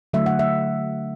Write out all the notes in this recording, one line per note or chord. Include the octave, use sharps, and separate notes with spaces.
D3 F#3 A3 E5
F#5
E5